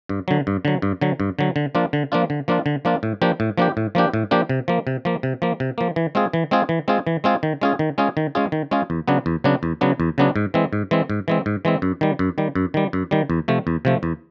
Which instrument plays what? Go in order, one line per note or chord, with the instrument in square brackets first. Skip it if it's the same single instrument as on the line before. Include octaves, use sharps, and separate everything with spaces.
[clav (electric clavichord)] G2
D3 F#3
G2
D3 F#3
G2
D3 F#3
G2
D3 F#3
D3
F3 A#3 D4 F4
D3
F3 A#3 D4 F4
D3
F3 A#3 D4 F4
D3
F3 A#3 D4 F4
A2
F3 A#3 D4 G4
A2
F3 A#3 D4 G4
A2
F3 A#3 D4 G4
A2
F3 A#3 D4 G4
C3
F3 A#3
C3
F3 A#3
C3
F3 A#3
C3
F3 A#3
E3
G#3 C4 F4 G#4
E3
G#3 C4 F4 G#4
E3
G#3 C4 F4 G#4
E3
G#3 C4 F4 G#4
D#3
G#3 C#4 F4 G#4
D#3
G#3 C#4 F4 G#4
D#3
G#3 C#4 F4 G#4
D#3
G#3 C#4 F4 G#4
E2
C#3 F#3 B3 D4
E2
C#3 F#3 B3 D4
E2
C#3 F#3 B3 D4
E2
C#3 F#3 B3 D4
G#2
E3 G#3 C4
G#2
E3 G#3 C4
G#2
E3 G#3 C4
G#2
E3 G#3 C4
F#2
D#3 G3
F#2
D#3 G3
F#2
D#3 G3
F#2
D#3 G3
E2
C3 F3 A3
E2
C3 F3 A3
E2